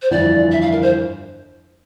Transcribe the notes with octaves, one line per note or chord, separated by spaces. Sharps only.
C5
G1 F2 E3 D5
E5
F5
A#4
C5